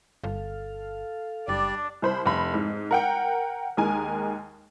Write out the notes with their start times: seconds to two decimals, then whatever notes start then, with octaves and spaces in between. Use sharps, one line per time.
0.23 G1 A4 F5
1.48 F#1 G3 D4 D5
2.02 C2 C5 B5
2.26 F1 B5
2.54 G#2
2.91 A#4 F#5 G5
3.77 D#2 D#3 G#3 A#4 G#5